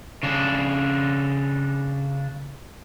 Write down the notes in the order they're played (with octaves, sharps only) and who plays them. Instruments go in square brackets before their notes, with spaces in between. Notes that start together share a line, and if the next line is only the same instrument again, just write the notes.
[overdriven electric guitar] C#3 D4